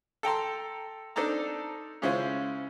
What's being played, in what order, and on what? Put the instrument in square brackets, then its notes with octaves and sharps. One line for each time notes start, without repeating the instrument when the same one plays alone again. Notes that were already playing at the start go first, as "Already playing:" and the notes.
[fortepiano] A4 G5 A#5 C6
C4 D4 D#4 A4 A5 A#5
C#3 G#3 C#4 E4 F4 C5